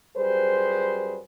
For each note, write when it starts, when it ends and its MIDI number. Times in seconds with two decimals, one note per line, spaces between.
0.17 1.19 42
0.17 1.19 55
0.17 1.19 68
0.17 1.19 71
0.17 1.19 72